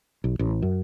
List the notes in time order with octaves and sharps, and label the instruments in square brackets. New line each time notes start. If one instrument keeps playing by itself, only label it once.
[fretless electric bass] B1
A1
F#2